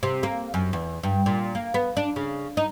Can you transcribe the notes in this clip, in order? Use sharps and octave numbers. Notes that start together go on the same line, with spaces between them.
C3
A#3
F#2
E2
G2
A#2
A#3
B3
D4
C#3
D#4